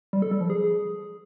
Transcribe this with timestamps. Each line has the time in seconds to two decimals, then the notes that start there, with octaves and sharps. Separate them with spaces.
0.13 G3
0.22 A4
0.31 G3
0.41 F3
0.50 G#4